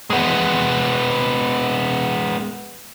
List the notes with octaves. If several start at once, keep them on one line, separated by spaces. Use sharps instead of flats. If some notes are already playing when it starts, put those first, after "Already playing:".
G#3 B3